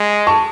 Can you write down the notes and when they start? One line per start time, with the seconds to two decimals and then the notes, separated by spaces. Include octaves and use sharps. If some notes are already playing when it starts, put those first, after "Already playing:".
Already playing: G#3
0.27 A5 C#6